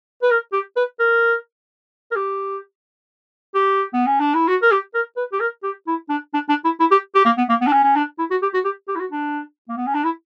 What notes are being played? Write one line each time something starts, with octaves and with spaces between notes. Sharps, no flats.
B4
A#4
G4
B4
A#4
A#4
G4
G4
B3
C#4
D4
E4
F#4
A#4
G4
A#4
B4
G4
A#4
G4
E4
D4
D4
D4
E4
E4
G4
G4
A#3
B3
A#3
B3
D4
C#4
C#4
D4
E4
F#4
G4
F#4
G4
G4
E4
F#4
D4
A#3
B3
C#4
D4
E4